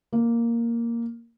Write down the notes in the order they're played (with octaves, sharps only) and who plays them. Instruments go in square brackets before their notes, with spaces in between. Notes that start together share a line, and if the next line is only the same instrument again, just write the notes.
[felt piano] A#3